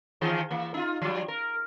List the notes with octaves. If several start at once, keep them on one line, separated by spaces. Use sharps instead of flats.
D#3 E3 G#4
E3 A#3
D#4 F4
F3 G3
A#4